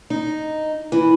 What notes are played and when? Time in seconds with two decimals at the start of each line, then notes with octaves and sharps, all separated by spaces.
0.10 D#4
0.92 E3